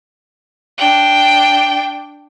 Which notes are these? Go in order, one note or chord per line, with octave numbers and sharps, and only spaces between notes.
D4 G5